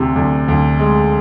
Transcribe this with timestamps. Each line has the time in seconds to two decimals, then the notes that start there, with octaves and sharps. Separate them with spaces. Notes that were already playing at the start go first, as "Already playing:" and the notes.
Already playing: D2 C3
0.16 D2
0.48 D2
0.79 G#3